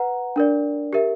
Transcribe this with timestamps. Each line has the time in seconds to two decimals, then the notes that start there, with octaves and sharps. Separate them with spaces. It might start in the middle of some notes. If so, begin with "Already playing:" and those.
Already playing: B4 F#5 A#5
0.36 D4 A#4 D5
0.93 G4 A#4 E5